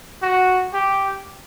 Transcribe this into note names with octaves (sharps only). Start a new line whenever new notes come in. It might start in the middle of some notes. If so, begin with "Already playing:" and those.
F#4
G4